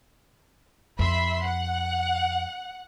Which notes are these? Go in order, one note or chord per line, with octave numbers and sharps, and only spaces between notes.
F2 E5 B5 C6
F#5